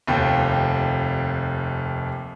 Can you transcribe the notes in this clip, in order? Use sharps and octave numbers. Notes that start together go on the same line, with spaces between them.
F1 D#2 G5